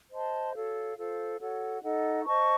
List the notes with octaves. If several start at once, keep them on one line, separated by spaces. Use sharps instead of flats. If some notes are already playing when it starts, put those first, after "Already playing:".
C5 D#5 A5 C6
F#4 A4 C#5 F5
F4 A4 C5 F5
F#4 A4 C#5 F#5
D#4 A4 D#5 F#5
C5 D#5 A5 C#6